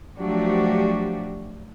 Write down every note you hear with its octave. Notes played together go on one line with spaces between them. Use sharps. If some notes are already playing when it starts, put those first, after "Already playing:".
F3 F#3 A3 D4 F#4 G4